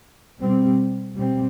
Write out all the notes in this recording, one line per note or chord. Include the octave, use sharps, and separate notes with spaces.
B2 G3 C4
B2 G3 C4